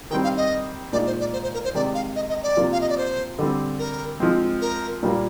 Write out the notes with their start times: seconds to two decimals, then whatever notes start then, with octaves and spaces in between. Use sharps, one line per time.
0.11 D#3 G3 C4 G5
0.24 F5
0.37 D#5
0.93 A#2 G#3 D#4 D5
1.07 C5
1.20 D5
1.33 C5
1.43 C5
1.54 A#4
1.64 C5
1.74 C3 D#3 G#3 D5
1.94 F5
2.16 D#5
2.29 D#5
2.43 D5
2.56 C3 F3 A#3 F4
2.72 F5
2.81 D#5
2.89 D5
2.98 C5
3.39 D3 G3 C4
3.79 A#4
4.20 F3 G#3 C4
4.61 A#4
5.03 A#2 G3 A#3